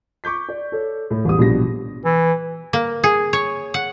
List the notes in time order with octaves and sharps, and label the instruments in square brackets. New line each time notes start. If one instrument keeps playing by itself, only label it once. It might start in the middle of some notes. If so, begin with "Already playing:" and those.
[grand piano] C#6 D6 G6 B6
D5
A4 C#5
A2
A1 E2 G3 D#6
A#1 B2 G3 A#6
[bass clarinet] E3
[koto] A#3
G#4
C#5
F#5